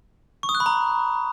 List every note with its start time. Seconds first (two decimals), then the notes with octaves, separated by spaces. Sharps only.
0.43 C#6
0.49 D#6
0.55 F#6
0.60 B5
0.66 A#5